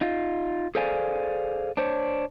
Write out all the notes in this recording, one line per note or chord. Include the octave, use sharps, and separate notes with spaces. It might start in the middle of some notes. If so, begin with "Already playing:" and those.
D#4 F4
G#4 A4 C5 D5 F5 G#5
D4 C5 C#5